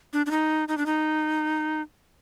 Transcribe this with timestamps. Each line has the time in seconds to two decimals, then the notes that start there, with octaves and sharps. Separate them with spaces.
0.13 D4
0.26 D4
0.31 D#4
0.68 D#4
0.78 D4
0.86 D#4